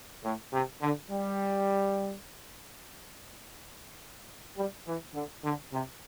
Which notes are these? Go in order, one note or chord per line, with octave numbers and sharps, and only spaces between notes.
A2
C3
D3
G3
G3
E3
D3
D3
C3